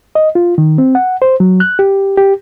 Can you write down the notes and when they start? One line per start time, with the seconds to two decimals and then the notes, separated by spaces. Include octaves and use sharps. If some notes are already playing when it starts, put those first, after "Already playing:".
0.15 D#5
0.35 F4
0.58 D#3
0.78 C4
0.95 F#5
1.22 C5
1.40 F#3
1.60 F#6
1.79 G4
2.18 G4